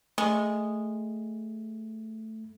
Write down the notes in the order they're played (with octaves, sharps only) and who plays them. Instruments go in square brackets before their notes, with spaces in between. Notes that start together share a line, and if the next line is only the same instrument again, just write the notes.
[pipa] G#3 [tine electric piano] A3